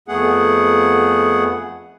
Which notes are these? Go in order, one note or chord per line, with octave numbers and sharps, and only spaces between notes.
F2 A3 B3 G#4 F#5